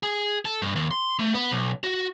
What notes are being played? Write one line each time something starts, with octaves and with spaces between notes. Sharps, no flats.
G#4
A4
G2
D#2
C6
A3
B3
B1
F#4